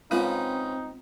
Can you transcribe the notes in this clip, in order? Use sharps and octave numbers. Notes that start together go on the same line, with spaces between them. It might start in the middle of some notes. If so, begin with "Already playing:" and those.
C#3 G#3 C4 D#4 F4 B4 F#5